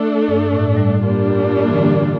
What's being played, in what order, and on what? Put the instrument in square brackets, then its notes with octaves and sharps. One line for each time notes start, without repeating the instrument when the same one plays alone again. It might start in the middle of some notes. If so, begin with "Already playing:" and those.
Already playing: [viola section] A3 D4 A4
[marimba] G2
A2
G2
A2
G3
[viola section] G3 A#3 D4 F4
[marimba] E3
D3